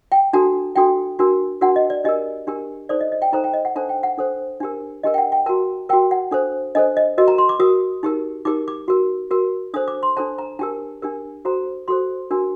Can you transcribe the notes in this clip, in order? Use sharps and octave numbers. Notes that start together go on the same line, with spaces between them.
G5
D4 F#4 A4 A5
D4 F#4 A4 G5
D4 F#4 A#4
D4 F#4 A#4 F#5
D#5
D5
D4 G4 A#4 D#5
D4 G4 A#4
D#4 A4 C5 D5
D#5
D#5
G5
D#4 A4 C5 A#5
G5
D#5
F#5
D4 A4 C5 A5
G5
F#5
D4 A4 C5
D4 G4 A#4
D4 G4 A#4 D#5
G5
F#5
G5
F#4 A#4 A5
F#4 A#4 G5
F#5
D4 A4 C5
D4 A4 C5 D#5
D#5
F#4 A#4 D#5
A#5
C6
D6
F#4 A#4 D#6
D#4 G4 A#4
D#4 G4 A#4 D6
D6
F#4 A#4
F#4 A#4
D4 A4 C5 D#6
D6
C6
D4 A4 C5 A5
A#5
D4 G4 A#4 A5
D4 G4 A#4
F#4 A4 C5 A#5
F#4 A4 C5 C6
D4 F#4 A#4